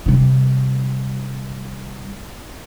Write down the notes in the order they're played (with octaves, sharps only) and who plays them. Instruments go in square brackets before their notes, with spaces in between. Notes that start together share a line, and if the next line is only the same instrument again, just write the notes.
[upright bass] C3 G3